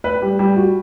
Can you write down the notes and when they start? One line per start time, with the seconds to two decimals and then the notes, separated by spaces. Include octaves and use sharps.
0.04 B4
0.22 G3
0.39 G3
0.57 F#4